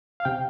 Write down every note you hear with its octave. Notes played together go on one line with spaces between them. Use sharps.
F5
C3 G5